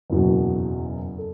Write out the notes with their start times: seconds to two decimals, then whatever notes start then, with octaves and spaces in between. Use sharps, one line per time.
0.10 F#1 E2 B2
1.18 A4